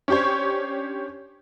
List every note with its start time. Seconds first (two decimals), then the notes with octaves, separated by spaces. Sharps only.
0.08 C#4 D4 G4 C5 C#5